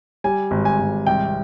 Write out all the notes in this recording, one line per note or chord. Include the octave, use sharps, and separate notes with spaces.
G3 G#5
G#1
G#5
G#1
C2 G5